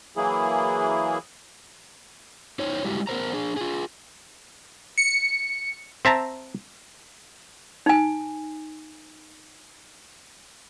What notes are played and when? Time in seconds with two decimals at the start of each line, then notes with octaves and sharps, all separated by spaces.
0.17 E3 F#3 A#3 E4 G#4
2.59 D#4 E4 C5 C#5
2.85 G3 G#3 E4 F#4 G4
3.07 B3 A#4 C5 A#5
3.33 D4 G#4
3.56 F4 G#4
4.98 C#7
6.05 C4 E5 A5 A#5
7.86 D#4 G#5